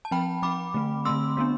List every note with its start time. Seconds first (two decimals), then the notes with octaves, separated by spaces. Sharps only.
0.05 A5
0.11 F3 C4 G5 B5
0.42 F3 C4 B5 D6
0.74 D3 A3 C4
1.05 D3 A3 C4 C6 E6
1.37 G3 B3 D4